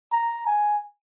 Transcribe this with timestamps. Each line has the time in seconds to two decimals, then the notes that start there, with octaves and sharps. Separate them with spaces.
0.12 A#5
0.47 G#5